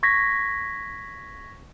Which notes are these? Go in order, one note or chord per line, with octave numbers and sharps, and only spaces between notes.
C#6 G#6 A#6 B6